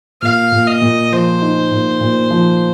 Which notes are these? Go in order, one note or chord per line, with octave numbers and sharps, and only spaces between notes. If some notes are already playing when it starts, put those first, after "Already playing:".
A#2 F5
A#2
D#5
A#2
F3 C5
D#4
A#2
A#2
F3